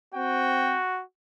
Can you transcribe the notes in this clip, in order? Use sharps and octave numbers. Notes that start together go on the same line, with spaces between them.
C4 F#4 G5